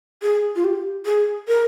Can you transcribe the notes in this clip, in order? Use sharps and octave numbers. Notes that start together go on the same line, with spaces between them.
G#4
F4
G4
G#4
A#4